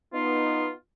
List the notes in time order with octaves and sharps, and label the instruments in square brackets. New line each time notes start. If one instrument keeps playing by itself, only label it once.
[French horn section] B3 D#4 [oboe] F4